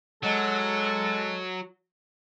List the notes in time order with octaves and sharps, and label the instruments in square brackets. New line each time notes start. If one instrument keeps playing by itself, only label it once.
[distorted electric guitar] F#3 [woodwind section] G#3 A4